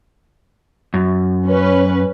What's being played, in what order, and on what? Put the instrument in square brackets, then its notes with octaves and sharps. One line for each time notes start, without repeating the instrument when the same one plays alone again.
[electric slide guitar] F#2
[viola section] C#4 B4